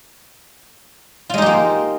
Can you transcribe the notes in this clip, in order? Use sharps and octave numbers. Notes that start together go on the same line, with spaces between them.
G#3 A#3 D#4 F4 G4